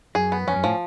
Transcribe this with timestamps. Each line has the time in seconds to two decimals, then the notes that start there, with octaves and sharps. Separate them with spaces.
0.15 F#2 G#4
0.32 B3
0.47 F2 C#4
0.56 F#2
0.64 A2 F3